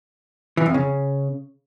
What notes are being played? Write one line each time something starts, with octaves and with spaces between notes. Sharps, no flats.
E3
F2
C#3